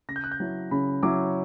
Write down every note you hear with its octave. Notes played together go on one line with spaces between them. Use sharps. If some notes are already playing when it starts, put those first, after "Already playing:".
C#3 A#6
G6
F#6
G6
F#3 C#4 E4
C#3 B5
F#3 C#4 E4 D6